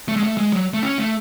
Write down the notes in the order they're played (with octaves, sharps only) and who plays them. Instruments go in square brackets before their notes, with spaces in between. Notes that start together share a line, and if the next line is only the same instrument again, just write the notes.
[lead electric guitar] A3
G#3
A3
G#3
F#3
A3
C#4
A3